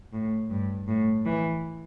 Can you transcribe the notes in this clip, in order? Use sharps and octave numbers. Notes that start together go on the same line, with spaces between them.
A2
G2
A2
E3